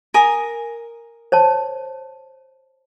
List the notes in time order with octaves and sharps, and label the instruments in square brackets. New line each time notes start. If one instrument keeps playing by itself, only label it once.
[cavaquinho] A#4 G#5 D#6
[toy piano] C5 C#5 A5